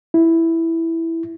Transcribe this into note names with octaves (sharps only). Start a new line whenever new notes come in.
E4